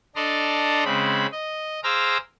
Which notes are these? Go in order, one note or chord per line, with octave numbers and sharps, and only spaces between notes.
D4 A4 D5 D#5 A#5 C6
C#3 G#3 C4 B5
D#5
G#4 C5 F5 A#5 D6 E6